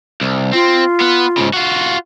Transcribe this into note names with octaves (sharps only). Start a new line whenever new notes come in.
C2
C4 F4
B3 B4
G#2 C#3
F4 F#4